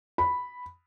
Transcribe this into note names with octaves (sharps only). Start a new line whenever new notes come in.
B5